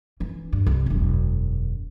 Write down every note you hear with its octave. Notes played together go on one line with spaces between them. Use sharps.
E3 C#4
G2
C2
E1 F#2